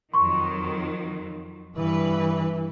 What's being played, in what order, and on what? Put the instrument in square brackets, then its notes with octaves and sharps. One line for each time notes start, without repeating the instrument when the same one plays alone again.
[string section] F2 D#3 F#3 [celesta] C6 C#6
[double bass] G2 E3 [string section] B4